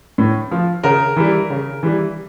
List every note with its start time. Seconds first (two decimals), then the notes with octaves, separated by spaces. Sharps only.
0.18 A2
0.51 F3
0.83 C#3 A#4
1.16 E3 G3
1.50 C#3
1.83 E3 G3